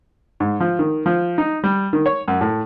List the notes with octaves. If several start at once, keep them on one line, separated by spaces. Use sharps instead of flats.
G#2
F3
D#3
F3
D#4
G3
D#3
C#5
F#2
A2